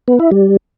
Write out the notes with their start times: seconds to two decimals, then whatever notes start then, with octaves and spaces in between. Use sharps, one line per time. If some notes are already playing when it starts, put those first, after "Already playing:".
0.08 B3
0.20 E4
0.31 G3